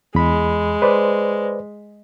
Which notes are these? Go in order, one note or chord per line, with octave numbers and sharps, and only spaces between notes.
E2 G#3 B5
B4 C5 D5